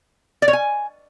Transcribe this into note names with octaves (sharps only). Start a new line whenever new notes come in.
D5
C#5
G#5